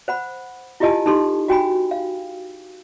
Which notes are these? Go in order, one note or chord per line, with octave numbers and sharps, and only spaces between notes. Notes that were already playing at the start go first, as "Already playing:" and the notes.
C5 F#5 B5
E4 F4 G4 D#5 G#5 A5
D#4 G4 A4 C6
F#4 G5 G#5 B5
F5